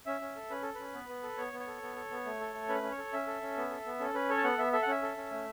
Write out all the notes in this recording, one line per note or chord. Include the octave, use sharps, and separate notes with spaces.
C#4 E5
C#4
A4
C#4 B4
A4
C#4 B4
B3
B3
A4
B3 C#5
B3
C#5
A4
B3
A4
B3
A3
A4
A3
C#4 B4
C#4
C#5
A4
C#4 E5
A4
C#4
B3
A4
B3
C#4 A4
C#4 B4
A4 C#5
A5
B3 F#5
B3 E5
A4 E5
F#5
C#4 E5
A4
C#4
A3